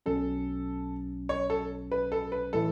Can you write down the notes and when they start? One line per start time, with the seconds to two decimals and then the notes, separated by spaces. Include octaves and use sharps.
0.06 B1 B2 F#3 C#4 A4
1.29 C#5
1.50 A4
1.92 B4
2.12 A4
2.32 B4
2.53 A2 E3 A3 A4